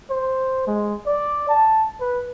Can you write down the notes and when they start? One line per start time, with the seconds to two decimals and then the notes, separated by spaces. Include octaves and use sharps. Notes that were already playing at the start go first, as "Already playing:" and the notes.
0.10 C5
0.67 G#3
1.07 D5
1.49 A5
2.01 B4